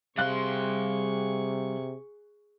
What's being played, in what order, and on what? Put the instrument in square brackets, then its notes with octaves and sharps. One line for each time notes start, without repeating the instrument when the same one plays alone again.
[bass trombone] C3 [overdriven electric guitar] G3 C6 [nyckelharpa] G#4 C#6 [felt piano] F5 F#6